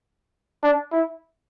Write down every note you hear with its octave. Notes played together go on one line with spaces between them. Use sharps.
D4
E4